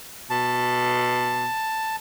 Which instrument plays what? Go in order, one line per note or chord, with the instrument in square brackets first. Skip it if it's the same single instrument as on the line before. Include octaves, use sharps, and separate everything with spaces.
[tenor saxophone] B2 [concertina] A5